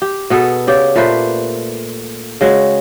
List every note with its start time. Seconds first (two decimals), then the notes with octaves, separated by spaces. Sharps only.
0.02 G4
0.30 B2 B3 G#4 A4
0.67 C#3 G4 D5 G5
0.96 A#2 A3 B4 C5
2.41 C#3 G#3 F#4